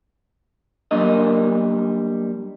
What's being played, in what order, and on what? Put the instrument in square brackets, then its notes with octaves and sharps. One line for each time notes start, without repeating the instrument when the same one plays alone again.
[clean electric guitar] F#3 G3 A#3 D4 A#4 D#5